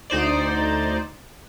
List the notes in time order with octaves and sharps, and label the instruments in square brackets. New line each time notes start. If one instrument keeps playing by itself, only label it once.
[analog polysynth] D2 D#4 C5 D5